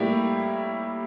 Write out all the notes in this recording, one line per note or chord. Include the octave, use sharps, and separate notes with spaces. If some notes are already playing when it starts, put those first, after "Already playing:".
Already playing: A2 G3 A#3 E4 G4